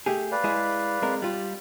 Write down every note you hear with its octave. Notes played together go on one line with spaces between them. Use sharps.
A3 G4 G#4
B4 D5 F5
G#3 E4 G#4
G#3 C4 A#4
G3 F4